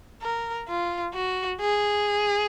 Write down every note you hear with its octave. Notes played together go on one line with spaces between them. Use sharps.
A#4
F4
F#4
G#4